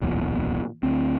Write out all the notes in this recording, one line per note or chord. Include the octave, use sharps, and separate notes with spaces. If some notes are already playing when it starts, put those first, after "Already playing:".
D1 B1 E2 A#2
D2 C4